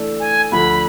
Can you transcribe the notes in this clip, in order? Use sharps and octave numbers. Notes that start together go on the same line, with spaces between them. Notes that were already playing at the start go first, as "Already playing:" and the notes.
Already playing: E3 A3 D4 A4
G#5
D2 D3 F3 B5